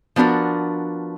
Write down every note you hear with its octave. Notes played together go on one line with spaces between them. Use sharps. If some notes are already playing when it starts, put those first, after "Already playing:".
F3 B3 D4 F#4 A#4